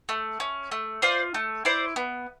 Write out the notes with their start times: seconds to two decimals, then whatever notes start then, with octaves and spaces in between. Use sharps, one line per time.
0.09 A3
0.40 C#4
0.72 A3
1.02 F4 C5 D5
1.34 A3
1.65 E4 C5 D5
1.96 B3